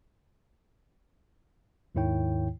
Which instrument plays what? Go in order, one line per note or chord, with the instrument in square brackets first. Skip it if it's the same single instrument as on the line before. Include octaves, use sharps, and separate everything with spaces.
[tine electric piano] D#2 G#2 D#3 E4 C#5 G5